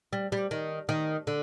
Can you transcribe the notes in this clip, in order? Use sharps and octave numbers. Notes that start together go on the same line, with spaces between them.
G3
G3
D#3
D#3
D3